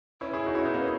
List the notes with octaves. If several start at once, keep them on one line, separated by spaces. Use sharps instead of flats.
C#4 E4
E4 G#4
D#4 F#4
C#4 E4
B3 D#4
A#3 C#4